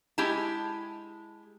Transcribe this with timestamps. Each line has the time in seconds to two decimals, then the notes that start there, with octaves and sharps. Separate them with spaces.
0.18 G#3 E4 G4 G#5 A5